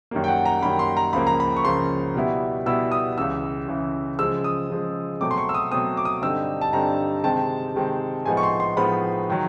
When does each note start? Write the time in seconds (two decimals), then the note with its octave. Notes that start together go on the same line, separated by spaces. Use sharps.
0.11 F#2 D#3 G3 A#3
0.24 G5
0.28 F#5
0.45 A#5
0.62 F#2 D#3 G3 A#3 B5
0.79 C6
0.97 A#5
1.13 C#2 C#3 F3 A#3 B5
1.27 A#5
1.40 B5
1.56 C#6
1.64 C#2 C#3 F3 A#3 C6
2.15 B2 G3 B3 E4
2.66 B2 G3 B3 E4 E6
2.92 D#6
3.17 C#2 C#3 E3 E6
3.68 C#2 C#3 E3
4.19 C#3 F3 G#3 E6
4.44 D#6
4.70 C#3 F3 G#3
5.21 B2 F#3 A3 C4 D6
5.31 C6
5.38 C#6
5.49 E6
5.54 D#6
5.71 B2 F#3 A3 C4 D#6
5.97 D6
6.05 D#6
6.22 G2 D3 G3 C4 D#4 E6
6.61 A5
6.73 G2 D3 G3 C4 D#4 A#5
7.24 C3 D#3 G#3 C4 A5
7.75 C3 D#3 G#3 C4
8.26 A2 F3 G#3 B3 D#4 G#5
8.37 C#6
8.43 C6
8.60 C6
8.77 A2 F3 G#3 B3 D#4 B5
9.29 D#3 F#3